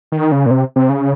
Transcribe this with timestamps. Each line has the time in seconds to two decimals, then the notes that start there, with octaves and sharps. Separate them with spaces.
0.12 D#3
0.32 C#3
0.46 A#2
0.51 C3
0.76 C3
0.89 C#3